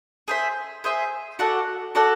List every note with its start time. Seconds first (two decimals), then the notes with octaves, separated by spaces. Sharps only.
0.28 G#4 C5 E5
0.84 G#4 C5 E5
1.39 F#4 A4 D5 F#5
1.95 F#4 A4 D5 F#5